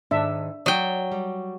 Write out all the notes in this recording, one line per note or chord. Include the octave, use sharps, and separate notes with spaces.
G#2 D#3 D4 E5
F#3 D5 G5 D#6
G3